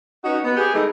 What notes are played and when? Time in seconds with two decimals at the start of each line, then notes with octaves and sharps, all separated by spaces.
0.24 C#4 D#4 F#4 B4
0.43 B3
0.57 G4 G#4
0.74 E3 G#3 A3 D#4